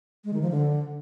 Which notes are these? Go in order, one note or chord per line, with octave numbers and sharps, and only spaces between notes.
G#3
D#3
F3
D3